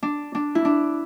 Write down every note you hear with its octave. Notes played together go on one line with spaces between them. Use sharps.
D4
D4
E4
D4